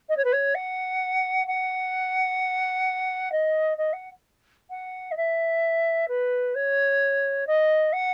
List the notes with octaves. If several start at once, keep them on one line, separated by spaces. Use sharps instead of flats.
D#5
C#5
B4
C#5
F#5
F#5
D#5
D#5
F#5
F#5
D#5
E5
B4
C#5
D#5
F#5